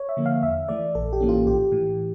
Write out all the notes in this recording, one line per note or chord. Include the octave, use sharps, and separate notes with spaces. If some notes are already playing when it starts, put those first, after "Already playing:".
Already playing: C#5
E5
D3 F3 A#3
F5
E2 E5
E3 A3 D5
A#1 A4
G4
A2 E3 A#3 C#4
F4
A#1 G4
A2 E3